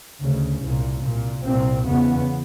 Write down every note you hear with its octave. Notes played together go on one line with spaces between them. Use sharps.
D2 C#3
C2 A#2
C2 A#2
C2 A#2 C4
E2 C#3 B3